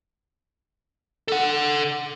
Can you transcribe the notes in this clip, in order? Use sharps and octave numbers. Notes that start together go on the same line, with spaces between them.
A4 F#5